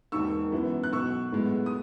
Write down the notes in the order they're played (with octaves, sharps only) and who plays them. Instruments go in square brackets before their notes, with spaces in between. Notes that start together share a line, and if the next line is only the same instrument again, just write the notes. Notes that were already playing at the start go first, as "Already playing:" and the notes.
[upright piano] E1 D#2 D#3 C#6 E6
F#2 E3 B3 E4
F#6
B1 B2 F#3 C#6 E6
B1 A2 G#3 B3
D#6